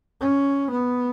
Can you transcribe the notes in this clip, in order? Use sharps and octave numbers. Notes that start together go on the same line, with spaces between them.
C#4
B3